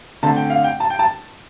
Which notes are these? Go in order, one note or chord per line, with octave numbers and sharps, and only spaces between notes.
D3 A3 C4 A5
G5
F5
G5
A5
G5
A5